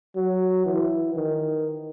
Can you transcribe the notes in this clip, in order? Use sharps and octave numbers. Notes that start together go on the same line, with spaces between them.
F#3
E3
D#3